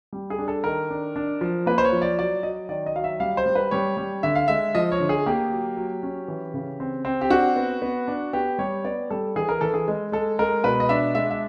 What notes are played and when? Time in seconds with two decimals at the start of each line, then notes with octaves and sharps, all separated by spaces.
0.13 G3
0.30 G#4
0.39 D4
0.48 A4
0.64 D#3 A#4
0.91 D4
1.16 D4
1.41 F3
1.66 A#3 B4
1.78 C5
1.85 C#5
1.93 F3
2.02 D5
2.19 F#3 D5
2.43 F#3 D#5
2.69 D#3 D5
2.86 D#5
2.96 F#3 F5
3.04 E5
3.20 G3 F5
3.37 C5
3.46 G3
3.55 B4
3.71 G3 C#5
3.97 G3
4.23 D3 E5
4.35 F5
4.48 G#3 E5
4.75 F3 D#5
4.92 C#5
5.00 D3
5.09 G#4
5.26 A#3 G4
5.52 F#3
5.77 F#3
6.03 C#4
6.28 E3
6.54 C#3
6.80 C4
7.05 C4
7.21 G4
7.30 D4 F#4
7.56 B3
7.82 B3
8.08 D4
8.33 B3 G4
8.59 G3 C#5
8.85 B3 D5
9.10 G3 A4
9.36 E3 G#4
9.49 A#4
9.61 E3 A4
9.74 G#4
9.88 G#3
10.12 G#3 A4
10.39 G#3 A#4
10.64 B2 B4
10.80 D#5
10.89 D4 E5
11.15 G#3 E5
11.31 E5